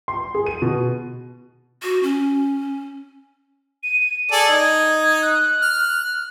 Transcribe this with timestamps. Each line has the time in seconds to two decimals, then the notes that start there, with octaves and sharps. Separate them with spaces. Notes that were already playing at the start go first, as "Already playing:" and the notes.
0.08 C6
0.35 G#4
0.46 D#7
0.62 B2
1.83 F#4
2.03 C#4
3.83 D#7
4.32 G#4 A4 D5 G#5
4.49 D#4 G#6
5.22 F#6
5.62 F6